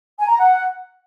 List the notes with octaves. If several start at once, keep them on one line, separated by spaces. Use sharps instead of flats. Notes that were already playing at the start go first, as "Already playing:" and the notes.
G#5
A#5
F#5